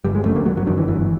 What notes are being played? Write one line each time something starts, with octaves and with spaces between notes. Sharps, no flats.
G1 G3
G#3
F#2 D3 A3
A#3
G1 F#3
F#3
F#2 D3 D#3
E3
G1 E3